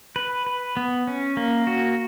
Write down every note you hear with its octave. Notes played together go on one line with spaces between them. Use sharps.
B4
B4
B3
C#4
A#3
F#4